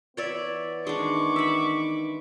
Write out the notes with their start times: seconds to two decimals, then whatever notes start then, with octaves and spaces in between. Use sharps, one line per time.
0.17 E3 B3 B4 C#5 D5 E5
0.87 D#3 G#3 D4 C#6 D6
1.36 E5 B5